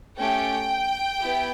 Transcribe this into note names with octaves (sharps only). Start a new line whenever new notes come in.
A3 C#4 G4 G5
B3 E4 G4